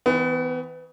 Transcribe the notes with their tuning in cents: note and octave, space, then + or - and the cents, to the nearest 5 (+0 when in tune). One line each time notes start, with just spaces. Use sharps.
E3 -30 B3 +30